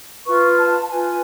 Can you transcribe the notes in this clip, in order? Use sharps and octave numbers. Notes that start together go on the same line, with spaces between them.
F4 B4 C#6
A5
A5
F4 B4 G#5